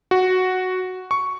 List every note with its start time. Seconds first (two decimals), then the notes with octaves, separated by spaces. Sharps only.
0.11 F#4
1.11 C#6